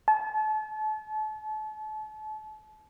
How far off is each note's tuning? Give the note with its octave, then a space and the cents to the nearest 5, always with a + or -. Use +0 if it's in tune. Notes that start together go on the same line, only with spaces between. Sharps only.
A5 -35